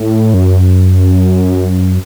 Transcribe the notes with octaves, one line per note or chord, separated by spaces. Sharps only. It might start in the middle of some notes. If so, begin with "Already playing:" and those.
Already playing: A2
F#2